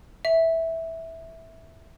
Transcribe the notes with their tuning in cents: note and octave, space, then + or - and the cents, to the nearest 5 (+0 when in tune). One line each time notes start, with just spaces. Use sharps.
E5 -10